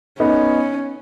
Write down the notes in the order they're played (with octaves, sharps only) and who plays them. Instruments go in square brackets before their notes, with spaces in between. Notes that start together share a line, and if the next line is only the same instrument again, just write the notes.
[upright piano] B3 D#4 [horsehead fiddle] C#4